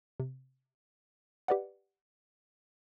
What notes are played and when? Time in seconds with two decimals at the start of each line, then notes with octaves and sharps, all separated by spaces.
0.20 C3
1.48 G4 B4 D5 D#5 F#5